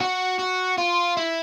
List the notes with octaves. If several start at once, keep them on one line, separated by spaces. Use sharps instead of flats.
F#4
F#4
F4
E4